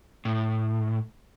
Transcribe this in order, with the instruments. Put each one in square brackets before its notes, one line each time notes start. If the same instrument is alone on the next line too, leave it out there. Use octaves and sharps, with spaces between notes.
[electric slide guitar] A2